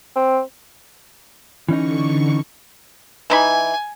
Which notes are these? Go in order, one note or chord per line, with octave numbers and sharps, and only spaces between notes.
C4
D3 E3 C#4 D#4 C#6
E3 D#4 G#5 B5